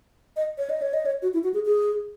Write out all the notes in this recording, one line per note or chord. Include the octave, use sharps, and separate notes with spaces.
D#5
C#5
D#5
C#5
D#5
C#5
F#4
E4
F#4
G#4
G#4